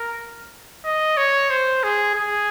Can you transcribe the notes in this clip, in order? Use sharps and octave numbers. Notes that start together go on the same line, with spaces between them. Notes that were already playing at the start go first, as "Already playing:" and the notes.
Already playing: A#4
D#5
C#5
C5
G#4
G#4